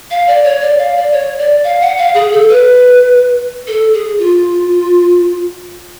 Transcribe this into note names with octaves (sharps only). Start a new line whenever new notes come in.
F5
D5
C#5
D5
F5
D5
C#5
D5
F5
F#5
F5
G#4
A4
B4
A4
G#4
F4